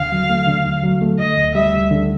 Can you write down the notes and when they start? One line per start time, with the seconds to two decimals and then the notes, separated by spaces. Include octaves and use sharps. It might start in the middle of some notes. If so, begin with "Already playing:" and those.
Already playing: D#2 D3 F5
0.12 F#3
0.30 A3
0.47 D3
0.66 D#2
0.83 F#3
1.02 A3
1.19 D3 D#5
1.37 D2
1.55 G3 E5
1.73 D2
1.91 D3